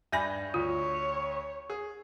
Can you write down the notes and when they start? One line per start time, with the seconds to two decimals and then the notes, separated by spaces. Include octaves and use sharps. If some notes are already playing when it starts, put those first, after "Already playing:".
0.12 G2 E5 G#5 B5 G6 A#6
0.54 D2 F4 C#5
1.70 G#4